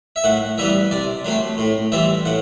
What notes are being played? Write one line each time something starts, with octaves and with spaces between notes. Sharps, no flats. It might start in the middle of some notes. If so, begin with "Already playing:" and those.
E5
A2 F#5
E3 G3 B3 E5
C3 D5
F#3 A3 C4
A2
E3 G3 C4 E5
A2 F#5